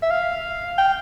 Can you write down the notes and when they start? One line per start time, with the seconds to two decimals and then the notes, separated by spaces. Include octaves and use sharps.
0.02 E5
0.11 F5
0.78 G5